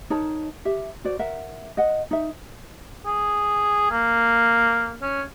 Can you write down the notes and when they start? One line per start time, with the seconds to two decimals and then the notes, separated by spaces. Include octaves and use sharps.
0.10 D#4 A#4 C#5 A5
0.65 G4 E5
1.04 F#4 C5 D5
1.19 A#4 E5 F#5
1.77 D#5 F#5
2.11 D#4 E5
3.06 G#4
3.91 A#3
5.02 C#4